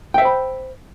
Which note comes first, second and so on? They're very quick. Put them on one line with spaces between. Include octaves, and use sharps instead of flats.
G5 E5 C5 B5